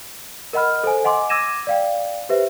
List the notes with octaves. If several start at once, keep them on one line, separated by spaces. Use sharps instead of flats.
A#4 D#5 F#5 B5 F6
A4 C5 G#5
D#5 F#5 G#5 C6 D6
D6 E6 G#6 A#6 D#7 E7
D5 F5 G5
G4 B4 C5 E5